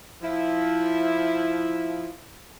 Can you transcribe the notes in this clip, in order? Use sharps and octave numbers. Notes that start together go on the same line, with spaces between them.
F3 E4